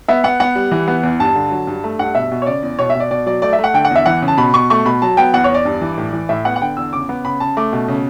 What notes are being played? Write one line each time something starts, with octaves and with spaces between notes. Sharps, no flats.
B3 E5
B3 F#5
B3 F#5
G3
E3
B3
E2
G2 A5
D3
F#3
G2
A3
G2 F#5
B2 E5
B2
C#5
C#3 D5
E2
B2 C#5
E5
B2 D5
B2 D5
F#3 D5
A3 D5
E5
A3
F#5
D3 G5
F#5
E2
E5
E3 F#5
C#3
A5
B2 B5
B2 C#6
A3 C#6
B2 B5
F#3 A5
B3 G5
E2 F#5
E2 C#5
D5
G2
E3
A2
E3
A2 E5
B3 F#5
F#5
D3 G5
E2 E6
C#3 D6
B3
C#3 B5
C#3 A5
A3 D6
B2
C#3